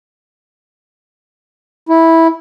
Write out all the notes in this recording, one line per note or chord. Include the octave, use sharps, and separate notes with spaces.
E4